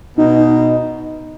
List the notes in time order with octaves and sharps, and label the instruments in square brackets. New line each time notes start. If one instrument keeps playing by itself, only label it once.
[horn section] B2 [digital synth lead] D#4